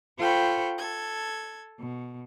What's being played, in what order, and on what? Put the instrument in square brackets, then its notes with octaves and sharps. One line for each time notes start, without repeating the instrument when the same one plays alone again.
[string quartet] F4 A4 C5 G5 B5 C#6
A4 G#6
B2